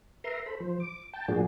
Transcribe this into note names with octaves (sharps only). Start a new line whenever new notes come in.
A#4 B4 E5 A#5 C6
A4 C5 B5
F3 C5
D6
G5 A5
A2 F3 A#3 D4 F#4 G#4